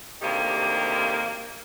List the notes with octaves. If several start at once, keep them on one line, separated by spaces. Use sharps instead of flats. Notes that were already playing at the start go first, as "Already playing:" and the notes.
D2 C3 D#3 A#3 G4